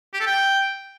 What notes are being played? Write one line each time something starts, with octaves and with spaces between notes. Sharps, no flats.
G4
A4
G5